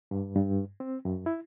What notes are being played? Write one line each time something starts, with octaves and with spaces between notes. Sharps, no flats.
G2
G2
C4
F#2
E4